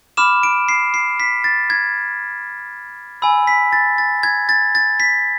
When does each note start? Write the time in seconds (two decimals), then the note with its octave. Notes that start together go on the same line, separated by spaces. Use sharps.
0.17 B5 D6 F6 E7
0.43 D7
0.69 C7
0.94 C7
1.20 B6
1.44 A6
1.70 G#6
3.22 G#5 B5 E6
3.47 B6
3.73 A6
3.98 A6
4.23 G#6
4.49 A6
4.75 A6
5.00 B6